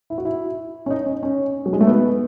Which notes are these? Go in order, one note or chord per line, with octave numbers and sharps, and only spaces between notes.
E4
F#4
E4
C#4
D#4
C#4
C#4
F#3
G#3
A3
B3